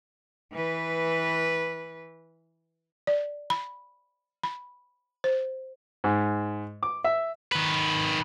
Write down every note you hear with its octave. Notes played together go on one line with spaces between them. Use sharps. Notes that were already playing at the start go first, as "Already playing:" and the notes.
E3 B4
D5
B5
B5
C5
G#2
D6
E5
D#3 B4